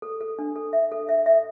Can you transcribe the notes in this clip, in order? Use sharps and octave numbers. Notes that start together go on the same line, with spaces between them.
A4
A4
D4
A4
E5
A4
E5
E5